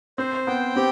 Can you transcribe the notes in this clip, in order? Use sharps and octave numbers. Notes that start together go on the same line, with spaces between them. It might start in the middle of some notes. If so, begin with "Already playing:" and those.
C4 C5
B3 G5
C4 G4